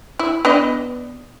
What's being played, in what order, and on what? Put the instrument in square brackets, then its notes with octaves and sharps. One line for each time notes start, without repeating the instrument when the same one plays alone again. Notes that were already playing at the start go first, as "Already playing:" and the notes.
[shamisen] E4
B3 D4 D#5